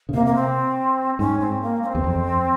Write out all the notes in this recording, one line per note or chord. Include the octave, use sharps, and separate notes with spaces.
C#3
C3 A#3
A#3
C4
G#2 C#4
C4
A#3
C#4
C4
E2
F2